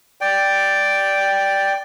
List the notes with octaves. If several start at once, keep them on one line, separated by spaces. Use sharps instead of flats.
D5 G5